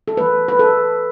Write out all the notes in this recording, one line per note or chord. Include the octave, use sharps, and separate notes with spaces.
A4
E3 A3 B4
B4
A4